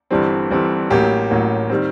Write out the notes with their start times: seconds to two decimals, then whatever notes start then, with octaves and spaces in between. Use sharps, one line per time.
0.11 G1 G2 E3 G3 C4
0.51 G1 G2 E3 G3 C4
0.90 A1 A2 F#3 A#3 G4
1.30 A1 A2 F#3 A#3
1.69 D#3 G3 C4